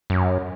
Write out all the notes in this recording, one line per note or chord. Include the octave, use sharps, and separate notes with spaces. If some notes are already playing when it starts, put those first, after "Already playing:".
F#2